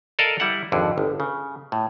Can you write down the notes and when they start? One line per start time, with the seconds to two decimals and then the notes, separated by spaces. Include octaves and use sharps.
0.19 A4 A#4 D5 D#5 F5 A5
0.40 G3 E4 E5 F#5
0.72 G#1 F2 D3
0.98 G1
1.20 C#3
1.72 A2